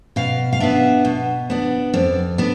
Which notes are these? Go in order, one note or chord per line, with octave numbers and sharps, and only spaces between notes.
B2 F5
F5
B3 D4 E5
B2
B3 D4
F2 D5
B3 D4